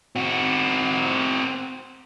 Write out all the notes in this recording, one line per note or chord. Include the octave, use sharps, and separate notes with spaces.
C4 F#4